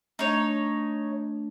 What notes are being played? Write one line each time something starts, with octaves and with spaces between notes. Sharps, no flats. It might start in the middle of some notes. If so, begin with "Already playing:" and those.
A3 D4 D#4 C#5